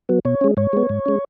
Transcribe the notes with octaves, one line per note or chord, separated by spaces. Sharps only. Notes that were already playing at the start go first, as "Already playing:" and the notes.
F#3 B3
B2 C#5
G#3 C#4
G#2 C#5
G#3 B3
G#2
G#3 C#4